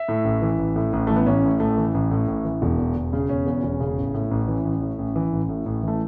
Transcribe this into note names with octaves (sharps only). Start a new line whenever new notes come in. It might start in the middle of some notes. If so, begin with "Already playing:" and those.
Already playing: E5
A2
A1
E3
A1
A2
A1
E3 A3
B3
A1 C#4
A2
A1 A3
E3
A1
A2
A1
E3
E1
E2
E1
C#3
E1 C#4
E2
E1
C#3
A1
A2
A1
E3
A1
A2
A1
E3
A1
A2
A1
E3 A3